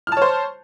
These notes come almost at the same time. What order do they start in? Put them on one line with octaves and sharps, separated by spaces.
F6 A5 C#5 C5